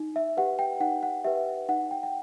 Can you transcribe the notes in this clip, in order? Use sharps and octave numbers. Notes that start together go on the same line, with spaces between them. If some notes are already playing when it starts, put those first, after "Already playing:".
Already playing: D#4
E5
G4 B4 F#5
G5
D#4 F#5
F#5
G4 B4 E5
D#4 F#5
G5
G5